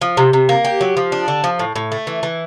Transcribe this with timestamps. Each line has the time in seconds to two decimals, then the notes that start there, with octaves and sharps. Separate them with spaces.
0.01 F3
0.17 C3
0.33 C3
0.49 A#3
0.64 G4
0.81 F#3
0.97 F3
1.12 D4
1.28 D3
1.44 F3
1.59 A2
1.76 A2
1.92 A3
2.07 E3
2.23 E3